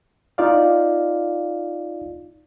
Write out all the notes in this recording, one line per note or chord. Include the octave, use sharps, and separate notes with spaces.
D#4 F4 D5 F5